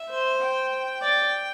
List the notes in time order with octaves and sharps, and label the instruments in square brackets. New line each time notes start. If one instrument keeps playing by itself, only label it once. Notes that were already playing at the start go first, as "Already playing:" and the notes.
Already playing: [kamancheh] E5
[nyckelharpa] C5
[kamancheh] G5
[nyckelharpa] D5